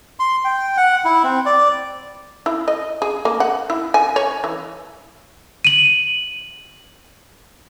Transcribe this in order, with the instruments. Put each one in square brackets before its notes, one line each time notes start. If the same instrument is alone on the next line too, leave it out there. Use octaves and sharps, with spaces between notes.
[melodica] C6
G5
F#5
E4
C4
D5
[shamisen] E4
D#5
G#4
A#3
F#5
E4
G#5
C#5
E3
[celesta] D#7 F#7